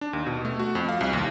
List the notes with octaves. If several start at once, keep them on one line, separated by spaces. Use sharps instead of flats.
D4
D#2
B2
A3
F#4
F2
F5
C2
D#2